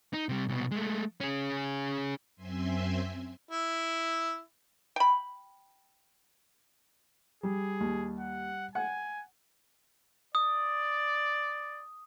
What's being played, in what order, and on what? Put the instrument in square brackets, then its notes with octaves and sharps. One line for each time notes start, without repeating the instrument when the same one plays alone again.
[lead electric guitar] D#4
C3 G3
C2 B2
G#3 A3
C#4 G#4
[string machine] F#2 C4 E5 G#5 C6
[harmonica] E4
[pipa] G5 B5
[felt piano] G3 [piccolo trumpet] G#4
[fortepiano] D#2
[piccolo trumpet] F#5
[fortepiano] F#5 [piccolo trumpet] G#5
[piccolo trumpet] D5 [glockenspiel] D#6